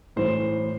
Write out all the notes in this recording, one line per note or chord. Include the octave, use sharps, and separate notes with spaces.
A2 E3 C5